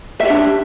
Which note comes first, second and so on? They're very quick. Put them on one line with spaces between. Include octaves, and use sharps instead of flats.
E5 G4 D4